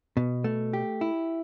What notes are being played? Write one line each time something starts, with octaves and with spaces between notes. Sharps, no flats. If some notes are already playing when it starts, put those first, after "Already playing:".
B2
A3
G4
E4